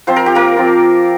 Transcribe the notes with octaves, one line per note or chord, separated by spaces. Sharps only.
F3 C4 F4 C5
A#4
G4
A#3 A#4
F3 C4 F4